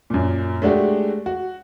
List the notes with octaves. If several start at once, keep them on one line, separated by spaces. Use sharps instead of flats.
F#2 A#2
G#3 A3 D4 F#4 G4
F#4